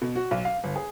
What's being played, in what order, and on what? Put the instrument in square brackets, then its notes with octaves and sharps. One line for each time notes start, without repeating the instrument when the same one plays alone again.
[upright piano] B2
F#4
B1
F5
G1
G#4